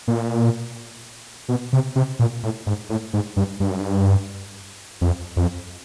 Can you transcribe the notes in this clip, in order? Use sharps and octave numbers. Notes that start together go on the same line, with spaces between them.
A#2
B2
C3
C3
A#2
A2
G#2
A2
G#2
G2
G2
F#2
G2
F2
F2